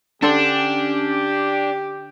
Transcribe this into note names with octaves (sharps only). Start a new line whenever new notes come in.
D3 C#4 D4 G4 A4 C5